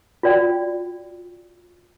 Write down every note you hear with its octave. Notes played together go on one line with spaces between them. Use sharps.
F4 F#4 D5 G5